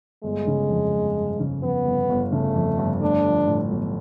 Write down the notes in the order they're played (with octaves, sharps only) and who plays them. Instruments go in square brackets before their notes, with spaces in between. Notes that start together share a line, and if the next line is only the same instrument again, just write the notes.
[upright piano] G1 [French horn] G#3
[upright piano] C#3
F2
G1
G1
C#3
[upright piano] F2 [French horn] B3
[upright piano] G1
G1
[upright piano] C#3 [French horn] A3
[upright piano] F2
G1
[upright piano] A3 [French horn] D4
[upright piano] F3
A2
B1